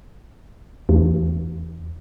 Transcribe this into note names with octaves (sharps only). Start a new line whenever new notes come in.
E2